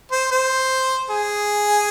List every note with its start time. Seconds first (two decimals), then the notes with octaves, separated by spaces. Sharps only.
0.11 C5
0.31 C5
1.10 G#4